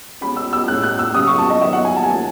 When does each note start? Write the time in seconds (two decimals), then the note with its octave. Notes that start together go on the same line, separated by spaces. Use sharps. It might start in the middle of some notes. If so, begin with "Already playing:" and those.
0.21 B2 G#3 C#4 B5
0.37 E6
0.53 E6
0.68 A2 G#3 C#4 F#6
0.83 F#6
0.99 E6
1.14 C#3 F#3 C#4 D#6
1.27 C#6
1.38 A5
1.50 D#5
1.61 D#3 F#3 B3 E5
1.73 F#5
1.85 G#5
1.96 A5
2.04 G#5
2.08 D#3 A3 C#4 A5